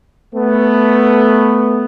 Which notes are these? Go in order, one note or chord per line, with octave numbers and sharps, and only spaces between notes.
A3 B3